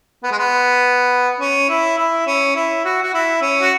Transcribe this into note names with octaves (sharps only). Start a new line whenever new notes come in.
B3
G#3
B3
C#4
E4
E4
C#4
E4
F#4
F#4
E4
C#4
F#4